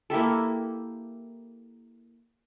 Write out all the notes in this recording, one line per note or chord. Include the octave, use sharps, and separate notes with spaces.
A#3 E4 G4 A4